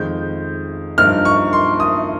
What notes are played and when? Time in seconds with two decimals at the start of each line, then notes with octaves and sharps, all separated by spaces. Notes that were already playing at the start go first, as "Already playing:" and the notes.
Already playing: F2 D#3 G#3 G6
0.98 G2 F3 A#3 D#4 F6
1.25 C#6
1.53 C6
1.80 D#6